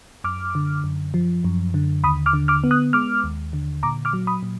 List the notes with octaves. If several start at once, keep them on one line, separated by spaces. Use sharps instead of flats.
F#2 D6 F6
D3
F#2
F3
F#2
D3
D#2 B5 D#6
D6 F6
D3
D6 F6
B3
D#6 F#6
G#3 D6 F6
D#2
D3
A#2 A#5 D6
D6 F6
F#3
B5 D#6
A#2